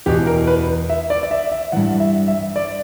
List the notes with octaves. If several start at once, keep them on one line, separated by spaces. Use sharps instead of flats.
E2 B2 G4
A#4
B4
E5
D5
D5
E5
E5
G2 E3 F#5
E5
E5
D5